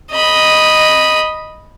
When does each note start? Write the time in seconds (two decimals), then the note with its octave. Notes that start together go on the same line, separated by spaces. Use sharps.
0.11 D#5 B5